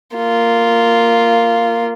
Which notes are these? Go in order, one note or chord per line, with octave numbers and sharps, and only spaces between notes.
A#3 F4